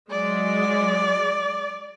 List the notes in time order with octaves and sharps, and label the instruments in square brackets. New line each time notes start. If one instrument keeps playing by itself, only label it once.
[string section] F#3 G#3 [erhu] D5